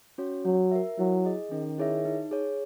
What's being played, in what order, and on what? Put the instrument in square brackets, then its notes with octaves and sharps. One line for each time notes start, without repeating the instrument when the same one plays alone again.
[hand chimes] C#4 F#4 C#5
[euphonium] F#3 [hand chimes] F#4
[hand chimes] A#4 E5
[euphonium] F#3 [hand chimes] E4
[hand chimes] G#4 D#5
[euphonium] D#3 [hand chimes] C#4
[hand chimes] E4 G#4 C#5 E5
D#4
G#4 C#5